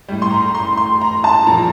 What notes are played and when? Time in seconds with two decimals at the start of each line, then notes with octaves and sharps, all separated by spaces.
0.08 A2 G3
0.22 C6
0.31 A#5
0.55 C6
0.77 C6
1.01 A#5
1.24 A5
1.47 A#2 F3 A#5